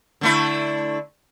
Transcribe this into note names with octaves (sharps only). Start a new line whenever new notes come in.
D3 A3 E4